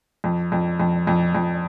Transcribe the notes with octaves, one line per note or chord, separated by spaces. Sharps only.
F2
F2
F2
F2
F2